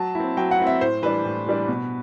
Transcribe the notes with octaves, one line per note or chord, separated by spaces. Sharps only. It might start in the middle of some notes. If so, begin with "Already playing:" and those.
Already playing: F#3 A5
C4 E4
F#3 G5
F#5
C4 E4
E5
A2 C5
E3 G3 D4 B4
A2
E3 G3 D4
B2